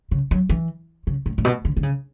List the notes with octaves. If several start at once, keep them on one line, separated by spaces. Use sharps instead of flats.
C#3
F#3
E3
C#3
A2
A2
B2
D3
D3
C#3